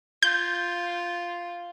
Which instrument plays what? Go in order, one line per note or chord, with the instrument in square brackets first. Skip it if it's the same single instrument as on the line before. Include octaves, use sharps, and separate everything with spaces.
[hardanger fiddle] F4 [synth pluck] G6